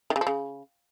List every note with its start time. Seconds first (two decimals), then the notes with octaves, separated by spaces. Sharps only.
0.10 D#3
0.16 C#3
0.21 F3
0.27 C#3